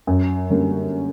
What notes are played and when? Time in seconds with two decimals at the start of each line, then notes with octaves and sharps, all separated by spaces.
0.07 F#2
0.50 D3 G3 A#3 C#4